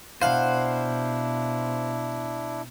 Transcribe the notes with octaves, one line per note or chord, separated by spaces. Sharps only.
B2 D4 E4 C5 F5 F#5